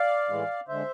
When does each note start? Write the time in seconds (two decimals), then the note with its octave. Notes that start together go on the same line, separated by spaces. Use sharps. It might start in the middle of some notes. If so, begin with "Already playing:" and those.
Already playing: D5 F5
0.29 A2 E3 G#3
0.68 D3 G#3 C5 E5